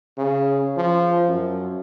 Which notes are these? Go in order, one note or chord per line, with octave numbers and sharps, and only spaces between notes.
C#3
F3
F#2